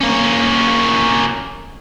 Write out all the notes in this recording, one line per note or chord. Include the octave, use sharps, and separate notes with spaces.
A#3 C#4